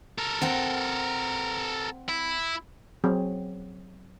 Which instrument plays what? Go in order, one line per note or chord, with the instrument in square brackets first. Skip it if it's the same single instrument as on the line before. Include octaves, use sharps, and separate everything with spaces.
[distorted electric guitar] A4 A#4
[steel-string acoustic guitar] C4 F#5 G5
[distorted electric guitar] E4
[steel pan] F#3 C4 G#4